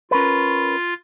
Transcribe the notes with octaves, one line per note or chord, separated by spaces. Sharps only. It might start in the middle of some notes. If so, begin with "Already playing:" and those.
C#4 F4 A#4 B4